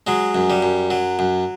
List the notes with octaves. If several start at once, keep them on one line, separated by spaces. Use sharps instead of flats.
F#3 G#3
F#2
G3
F#2
F#3
F#2